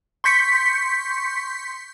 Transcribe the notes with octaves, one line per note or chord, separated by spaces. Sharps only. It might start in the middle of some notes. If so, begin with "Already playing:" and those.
C6 C#6 G6 B6 C#7